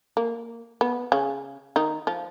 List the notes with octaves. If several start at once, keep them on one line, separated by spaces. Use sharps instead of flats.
A#3
B3
C#3 C#4
D#3 D#4
F3 F4